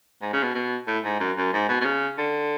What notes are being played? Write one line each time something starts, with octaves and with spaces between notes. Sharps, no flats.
G#2
C#3
B2
B2
A2
G#2
F#2
F#2
G#2
B2
B2
C#3
D3